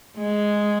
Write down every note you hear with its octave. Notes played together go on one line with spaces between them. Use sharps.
G#3